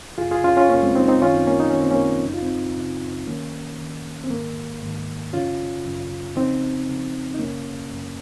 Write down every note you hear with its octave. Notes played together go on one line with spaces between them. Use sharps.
F#2 C#3 F4 G#4
F4 G#4
C#4 F4
C#4 F4
F#2 C#3 A#3 C#4
G#3 C4
C4 D#4
C4 D#4
F#2 D#3 C#4 F4
C4 D#4
A#3 C#4
D#4
F#2 D#3 C#4
C4
A#3 C#4
F#2 C#3 D#4
F4
C4 D#4
F#2 C#3
F2 D#3 A#3 C#4
F2 D#3
C4
G#2 D#3 A#3
G#2 D#3
F#2 C#3 C#4 F4
F#2 C#3
F2 C#3 C4 D#4
F2 C#3
D#4
F#2 C#3 A#3 C#4
F#2 C#3